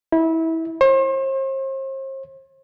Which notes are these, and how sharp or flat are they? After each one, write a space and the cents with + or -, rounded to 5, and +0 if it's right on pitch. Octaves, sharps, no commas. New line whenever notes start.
E4 -25
C5 +40